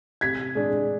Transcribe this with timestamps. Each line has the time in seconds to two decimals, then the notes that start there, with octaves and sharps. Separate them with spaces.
0.21 C3 G#6 B6
0.55 G#3 D4